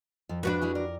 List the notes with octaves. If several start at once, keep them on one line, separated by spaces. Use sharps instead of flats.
F2 F3
F3 D4 F#4 B4
G3 E4 G#4
A#4 D5 D6 A#6